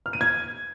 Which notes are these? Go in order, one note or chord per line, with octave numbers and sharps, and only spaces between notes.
F6
D#7
G#6